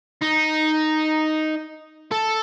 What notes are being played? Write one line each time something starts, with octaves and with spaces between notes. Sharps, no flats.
D#4
A4